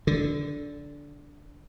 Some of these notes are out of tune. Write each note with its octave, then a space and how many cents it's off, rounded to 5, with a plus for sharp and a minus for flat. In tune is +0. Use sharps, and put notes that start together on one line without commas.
D3 -15